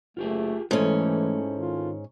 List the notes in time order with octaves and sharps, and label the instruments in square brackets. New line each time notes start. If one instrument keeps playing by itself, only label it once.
[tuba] F#1 [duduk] A3 [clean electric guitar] F4 G4 G#4
[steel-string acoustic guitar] G#2 C#4 [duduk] E3 [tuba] A3 [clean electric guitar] C4 E4 A4
[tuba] D#3 [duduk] F4